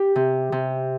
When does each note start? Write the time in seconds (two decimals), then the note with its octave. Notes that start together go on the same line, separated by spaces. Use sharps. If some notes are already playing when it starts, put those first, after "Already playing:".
Already playing: G4
0.16 C3
0.52 C3